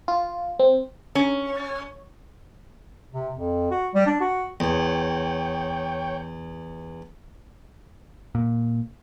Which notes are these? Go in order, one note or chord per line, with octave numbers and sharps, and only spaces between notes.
F4
C4
C#4
C3
F2
F#4
G3
D4
F#4
E2 C#5 G5
A#2